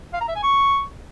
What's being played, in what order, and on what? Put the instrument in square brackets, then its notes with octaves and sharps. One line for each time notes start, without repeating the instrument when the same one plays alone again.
[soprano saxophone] F5
A#5
E5
G#5
C#6